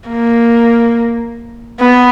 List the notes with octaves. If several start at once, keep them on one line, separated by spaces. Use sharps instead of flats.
A#3
B3